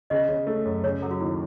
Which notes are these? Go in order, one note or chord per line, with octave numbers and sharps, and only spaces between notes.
C#3 D#5
C#3
A3
F#2
C#3 C#5
F#3 A4
F#4
D#2 E4